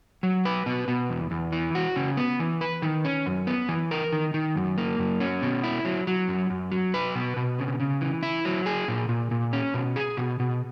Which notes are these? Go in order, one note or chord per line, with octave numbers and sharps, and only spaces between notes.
F#3
B4
B2
B2
E2
E2
E3
F#4
C#3
B3
E3
B4
D#3
C#4
F#2
B3
E3
A#4
D#3
D#3
F#2
A#3
F#2
C#4
B2
E4
F#3
F#3
F#2
F#2
F#3
B4
B2
B2
C#3
C#3
E3
E4
F#3
G#4
A#2
A#2
A#2
C#4
B2
G#4
B2
B2